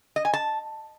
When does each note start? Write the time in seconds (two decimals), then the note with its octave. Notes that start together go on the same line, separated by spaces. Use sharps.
0.16 D#5
0.25 G#5
0.34 A5